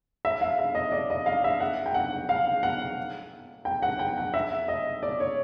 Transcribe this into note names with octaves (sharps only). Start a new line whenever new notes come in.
E5
F5
E5
D#5
D5
D#5
F5
E5
F#5
G5
F#5
F5
F#5
G5
F#5
G5
F#5
E5
D#5
D5
C#5